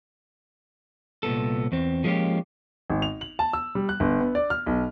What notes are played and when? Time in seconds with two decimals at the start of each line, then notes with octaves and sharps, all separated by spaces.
1.23 C2 A#2 B3 A4
1.72 E2 C4
2.04 F3 G#3 A#3 C#4 F4 G4
2.90 G#1
3.02 F7
3.21 F#7
3.39 A5
3.53 E6
3.75 G3
3.89 F#6
4.00 G1
4.21 B3
4.35 D5
4.50 F6
4.66 B1